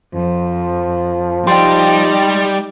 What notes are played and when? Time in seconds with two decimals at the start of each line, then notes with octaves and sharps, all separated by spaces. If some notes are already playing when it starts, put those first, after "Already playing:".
0.14 F2 F3
1.47 G3 D#4 G4 G5 A5 C6